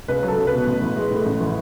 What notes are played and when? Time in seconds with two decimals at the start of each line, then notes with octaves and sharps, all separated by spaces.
0.08 C#2 B4
0.23 F#3
0.28 A4
0.38 C#2
0.47 B4
0.52 B2
0.67 A1
0.82 E3
0.96 G#3
1.11 A2
1.26 A1
1.40 E3